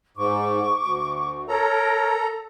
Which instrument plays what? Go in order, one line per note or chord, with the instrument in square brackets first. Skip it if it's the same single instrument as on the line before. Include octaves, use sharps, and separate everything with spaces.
[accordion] G#2 [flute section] C#6 D6
[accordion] D2
[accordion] A4 A#5 [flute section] A#4 C#5